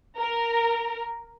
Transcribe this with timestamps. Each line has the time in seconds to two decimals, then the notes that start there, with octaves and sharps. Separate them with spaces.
0.19 A#4